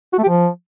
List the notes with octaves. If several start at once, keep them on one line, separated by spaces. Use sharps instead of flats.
F#4
A3
G4
F3